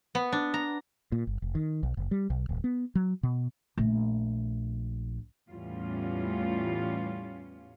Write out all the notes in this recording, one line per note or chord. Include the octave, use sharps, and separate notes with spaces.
B3
D4
A#5
A#2
G1
F1
D#3
B1
F#1
G3
B1
D1
B3
F#3
B2
A#1 A3
E2 A2 G3 C#4 F4